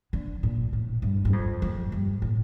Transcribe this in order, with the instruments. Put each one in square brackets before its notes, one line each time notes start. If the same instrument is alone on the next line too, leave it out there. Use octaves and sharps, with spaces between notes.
[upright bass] D3
A#2
A2
G2
G2
F2
F2
G2
A2